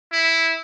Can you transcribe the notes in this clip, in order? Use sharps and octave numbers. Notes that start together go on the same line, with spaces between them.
E4